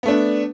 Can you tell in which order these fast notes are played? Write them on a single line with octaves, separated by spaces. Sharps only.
B3 A3 D4